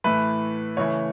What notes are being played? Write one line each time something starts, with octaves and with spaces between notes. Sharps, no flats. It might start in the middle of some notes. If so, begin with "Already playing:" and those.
A2 E3 A3 B4
C#3 E3 A3 C#5